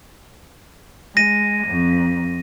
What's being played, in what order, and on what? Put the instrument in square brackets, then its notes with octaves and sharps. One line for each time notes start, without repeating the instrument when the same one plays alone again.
[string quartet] G#3 [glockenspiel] A#6 D#7
[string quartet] F2